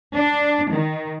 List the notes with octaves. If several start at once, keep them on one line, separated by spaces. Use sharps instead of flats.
D4
D#3